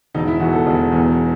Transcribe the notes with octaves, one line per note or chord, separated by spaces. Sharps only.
E1 D#4
E4
E2 B2 F#4
A4
E1
E2 B2